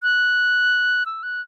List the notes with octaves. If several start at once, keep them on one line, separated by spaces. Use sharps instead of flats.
F#6
E6
F#6